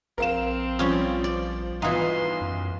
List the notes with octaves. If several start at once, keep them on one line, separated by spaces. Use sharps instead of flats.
A#1 C4 A#4 F5 E7
F3 G3 C#4 F4
D5
B1 E3 D#4 F4 C6
F#2